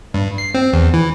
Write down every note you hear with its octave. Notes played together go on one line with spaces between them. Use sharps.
G2
C7
C4
E2
E3